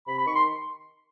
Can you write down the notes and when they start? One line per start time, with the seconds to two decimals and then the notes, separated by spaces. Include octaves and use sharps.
0.07 C3 B5
0.17 B5
0.26 D#3 C#6
0.35 C6